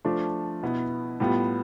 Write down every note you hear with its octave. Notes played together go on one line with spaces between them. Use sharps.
F3 A3 D4 F4
B2 B3 E4
A2 G3 B3 F4